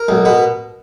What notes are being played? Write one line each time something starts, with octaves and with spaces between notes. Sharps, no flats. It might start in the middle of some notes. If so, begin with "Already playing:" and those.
Already playing: A#4
B1
B2